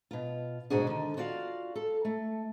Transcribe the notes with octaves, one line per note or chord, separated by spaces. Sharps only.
B2 F4
D2 G#2 B2 D4 F#4 G#4
D3 D#3
F4 F#4 D5 D#5 F5
A4
A3